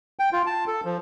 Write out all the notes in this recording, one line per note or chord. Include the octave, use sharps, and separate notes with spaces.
G5
F4
A5
A4
F3